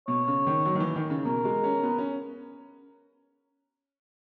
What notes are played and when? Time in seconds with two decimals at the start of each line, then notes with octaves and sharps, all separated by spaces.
0.07 B2 C#5
0.27 C#3
0.47 D#3
0.65 F#3
0.75 D#3
0.80 E3
0.96 D#3
1.10 C#3
1.25 B2 A#4
1.45 G#3
1.64 C#4
1.83 B3
1.98 C#4